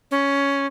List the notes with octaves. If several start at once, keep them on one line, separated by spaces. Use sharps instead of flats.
C#4